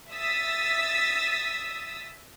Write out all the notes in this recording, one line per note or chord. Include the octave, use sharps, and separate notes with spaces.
E5 D#6 E6 A6 B6